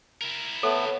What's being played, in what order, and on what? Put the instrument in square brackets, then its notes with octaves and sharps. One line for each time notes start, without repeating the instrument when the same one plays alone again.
[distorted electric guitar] E4 A#4
[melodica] A3 B3 [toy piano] A4 [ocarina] C#5